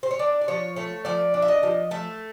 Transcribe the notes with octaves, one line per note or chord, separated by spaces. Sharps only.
C5
C#5
D4 D5
D5
F3 C#5
A3 C#5
F3 D5
D4
E5
D#5
F3
A3 E5